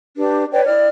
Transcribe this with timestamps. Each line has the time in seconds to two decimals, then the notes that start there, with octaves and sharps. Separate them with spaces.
0.17 D4 G4 B4
0.51 B4 C#5 D5 G5
0.65 E4 D5 F6